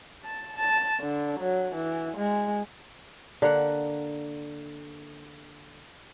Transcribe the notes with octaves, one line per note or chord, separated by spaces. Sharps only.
A5
A5
D3
F#3
E3
G#3
D3 A#3 F#5